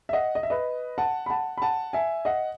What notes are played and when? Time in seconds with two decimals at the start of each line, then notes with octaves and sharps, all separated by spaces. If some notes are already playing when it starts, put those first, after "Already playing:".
0.09 E5
0.13 D#5 F#5
0.35 D#5
0.43 E5
0.50 B4 D#5
0.98 F#5 A5
1.26 B5
1.30 F#5 A5
1.58 B5
1.62 F#5 A5
1.93 E5 G#5
2.25 D#5 F#5